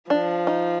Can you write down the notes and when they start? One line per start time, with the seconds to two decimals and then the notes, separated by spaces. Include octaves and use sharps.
0.10 F3 D4
0.47 D#4